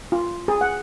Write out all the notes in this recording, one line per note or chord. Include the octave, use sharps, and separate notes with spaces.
F4
G#4
F#5